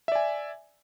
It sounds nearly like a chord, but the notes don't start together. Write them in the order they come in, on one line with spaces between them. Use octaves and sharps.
E5 D5 G#5